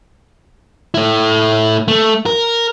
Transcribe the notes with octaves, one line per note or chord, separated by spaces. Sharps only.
A3 E4
A3
A#4